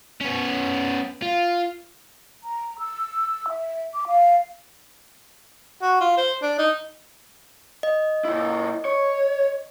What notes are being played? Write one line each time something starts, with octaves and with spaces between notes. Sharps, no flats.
B3 C#4
F4
A#5
E6
E5
D6
F5
F#4
F4
C5
D4
D#4
D#5
A#2 E4
C#5